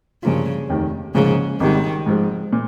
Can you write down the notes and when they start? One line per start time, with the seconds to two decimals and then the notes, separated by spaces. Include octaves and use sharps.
0.23 G2 C#3 F3 A#3 F4
0.68 F1 D#2 D#3
1.14 A#1 G#2 C#3 F3 A#3
1.60 G#1 G#2 D#3 G3
2.06 G#2 F3 G#3
2.53 A#2